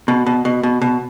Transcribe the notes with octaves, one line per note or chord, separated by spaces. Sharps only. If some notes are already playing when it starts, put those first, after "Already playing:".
B2
B2
B2
B2
B2